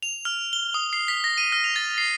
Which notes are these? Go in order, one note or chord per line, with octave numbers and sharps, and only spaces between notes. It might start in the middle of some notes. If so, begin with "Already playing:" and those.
F7
F6
G7
D#6
C7
B6
A#6
D#7
F6
F7
A6
C7